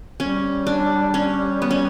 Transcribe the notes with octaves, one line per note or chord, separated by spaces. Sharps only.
G3 C#4
D4
C#4
B3
C#4